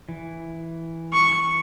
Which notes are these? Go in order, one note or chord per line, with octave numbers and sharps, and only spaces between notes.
E3
C#6